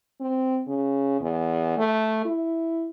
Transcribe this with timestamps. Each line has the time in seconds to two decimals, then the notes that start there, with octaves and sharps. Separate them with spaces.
0.20 C4
0.67 C#3
1.21 E2
1.77 A3
2.25 E4